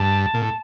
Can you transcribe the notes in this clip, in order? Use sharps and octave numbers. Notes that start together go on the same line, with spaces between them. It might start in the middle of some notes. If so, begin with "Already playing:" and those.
Already playing: G2 A5
A#2
A2